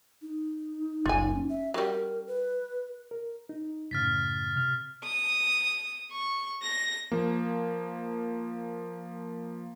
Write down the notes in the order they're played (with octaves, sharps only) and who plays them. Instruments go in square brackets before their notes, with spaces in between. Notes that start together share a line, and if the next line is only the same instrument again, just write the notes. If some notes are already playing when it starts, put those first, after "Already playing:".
[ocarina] D#4
[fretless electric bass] F#1 C#2 [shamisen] F4 G#5
[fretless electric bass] C#4
[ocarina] E5
[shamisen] F#3 G3 [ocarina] A#4
[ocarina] B4
[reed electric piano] A#4
D#4
[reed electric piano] F#2 A2 C#3 [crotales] F6 A6 B6
[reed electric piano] C3 F6
[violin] D#6
C#6
A#6
[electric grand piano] F3 A#3